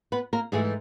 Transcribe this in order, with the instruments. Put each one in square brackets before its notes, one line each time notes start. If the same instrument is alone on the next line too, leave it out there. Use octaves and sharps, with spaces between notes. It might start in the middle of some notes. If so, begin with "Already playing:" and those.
[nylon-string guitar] B3 B4
A#3 A#4
G#2 E3 G#3 A3 G#4